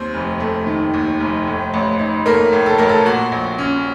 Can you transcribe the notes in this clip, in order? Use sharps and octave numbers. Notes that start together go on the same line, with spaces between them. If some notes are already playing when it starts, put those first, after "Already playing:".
Already playing: D#2 C4 C5
F1
A3
D#3
D#2
F1
A2
A1
D#4
A3 A#3 A#4
A2
A4
A1 A#4
A4
A#2 F#4
A#1
C#4